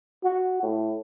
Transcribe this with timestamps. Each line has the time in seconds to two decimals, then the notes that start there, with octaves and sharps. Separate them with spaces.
0.24 F#4
0.63 A2